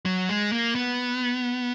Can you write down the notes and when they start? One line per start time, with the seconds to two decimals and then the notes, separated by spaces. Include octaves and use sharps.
0.06 F#3
0.29 G#3
0.52 A#3
0.75 B3